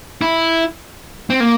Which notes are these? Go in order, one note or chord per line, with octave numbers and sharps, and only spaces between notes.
E4
C4
A#3